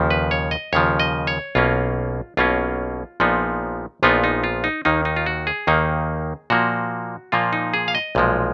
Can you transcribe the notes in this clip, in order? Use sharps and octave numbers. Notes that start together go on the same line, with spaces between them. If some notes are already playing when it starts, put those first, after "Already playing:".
Already playing: D#2 C#3 F3
B4
C#5
D#5
D#2 C#3 F3 C#5
D#5
C#5
B1 B2 A#3 C#4 F4
B1 B2 A#3 C#4 F4
A#1 A#2 F3 B3 D#4
A#1 A#2 F3 B3 D#4 F4
D#4
F4
D#4
D#2 D#3 A#3 D#4
D#4
F4
F#4
G#4
D#2 D#3 A#3 D#4
A#2 F3 A#3 F#4
A#2 F3 A#3 F4
D#4
G#4
F5
D#5
B1 A#2 F3 G#3